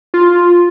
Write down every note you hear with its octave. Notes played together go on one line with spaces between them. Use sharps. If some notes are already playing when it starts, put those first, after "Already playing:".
F4